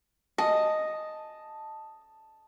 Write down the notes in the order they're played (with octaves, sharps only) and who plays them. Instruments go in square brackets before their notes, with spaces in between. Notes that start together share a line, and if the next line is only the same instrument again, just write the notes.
[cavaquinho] D#5 [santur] A5